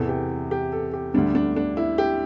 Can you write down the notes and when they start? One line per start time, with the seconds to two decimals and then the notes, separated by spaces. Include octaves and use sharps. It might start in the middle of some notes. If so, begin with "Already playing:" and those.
Already playing: E2 C3 E3 A4
0.09 G4
0.51 G4
0.72 A4
0.93 G4
1.14 D2 D3 G3 D4
1.35 D4
1.56 D4
1.77 E4
1.98 G4